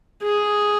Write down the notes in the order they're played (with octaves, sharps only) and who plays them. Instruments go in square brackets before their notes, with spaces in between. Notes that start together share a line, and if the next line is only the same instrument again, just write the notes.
[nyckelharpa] G#4